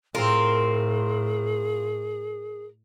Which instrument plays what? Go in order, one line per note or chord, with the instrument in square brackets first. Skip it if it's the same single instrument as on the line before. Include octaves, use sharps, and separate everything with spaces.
[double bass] A2 [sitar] C4 F4 [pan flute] G#4 [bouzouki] A#4